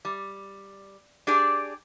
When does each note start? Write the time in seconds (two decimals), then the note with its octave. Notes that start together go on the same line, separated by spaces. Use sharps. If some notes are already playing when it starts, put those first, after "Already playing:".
0.05 G3
1.27 D4 G4 G#4 D5